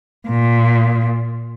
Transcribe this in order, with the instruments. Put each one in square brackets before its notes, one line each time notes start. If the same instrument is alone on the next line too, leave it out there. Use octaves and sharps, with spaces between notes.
[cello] A#2